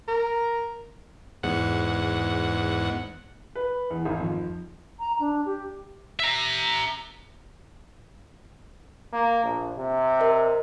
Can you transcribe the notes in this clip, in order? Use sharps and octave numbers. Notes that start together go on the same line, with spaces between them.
A#4
E2 G#2 F#5
B4
E2
G#1
F2
A#5
D4
G4
E5 A#5
A#3
A#1
C3
A#4 D#5